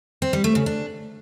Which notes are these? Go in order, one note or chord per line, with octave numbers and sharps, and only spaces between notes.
C4
G3
A3
C#3
D4